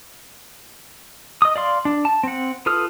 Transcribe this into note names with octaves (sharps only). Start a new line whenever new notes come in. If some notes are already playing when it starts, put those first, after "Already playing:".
D#5 D#6
D5 F5 C6
D4
A5
C4 F#5
F4 A4 B4 D#6 F6